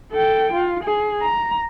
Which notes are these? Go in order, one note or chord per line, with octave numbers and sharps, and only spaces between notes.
A4 G5
F4
G#4
A#5